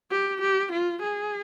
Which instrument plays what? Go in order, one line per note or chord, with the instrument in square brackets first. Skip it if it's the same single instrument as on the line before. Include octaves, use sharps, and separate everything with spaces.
[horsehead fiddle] G4
G4
F4
G#4